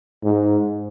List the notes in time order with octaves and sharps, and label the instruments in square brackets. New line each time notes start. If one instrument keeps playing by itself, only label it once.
[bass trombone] G#2